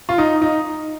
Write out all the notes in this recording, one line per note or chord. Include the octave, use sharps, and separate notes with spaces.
F4
D#4
D#4